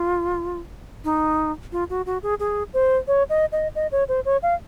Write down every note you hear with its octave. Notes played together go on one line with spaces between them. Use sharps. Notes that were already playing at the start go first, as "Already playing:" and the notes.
Already playing: F4
D#4
F4
F#4
F#4
G#4
G#4
C5
C#5
D#5
D#5
D#5
C#5
C5
C#5
F5